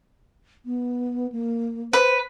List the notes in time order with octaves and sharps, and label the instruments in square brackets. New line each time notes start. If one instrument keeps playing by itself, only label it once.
[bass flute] B3
A#3
[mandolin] B4 [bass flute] C5